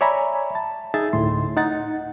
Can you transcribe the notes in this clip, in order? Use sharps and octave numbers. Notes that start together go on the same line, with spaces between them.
C#5 D5 E5 G#5 A#5 B5
A5
D#4 G#4 E5 A6
D2 A2 C6
D#4 F#5 A6